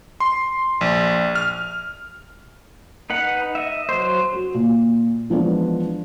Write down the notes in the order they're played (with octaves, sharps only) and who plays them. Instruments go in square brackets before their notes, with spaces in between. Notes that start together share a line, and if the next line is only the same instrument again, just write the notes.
[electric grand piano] C6
A#1
F6
[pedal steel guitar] D#4 B4 F#5
D#5 E5
F#3 C5
[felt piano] F#4
A#2
E3 F3 G#3 B3 D4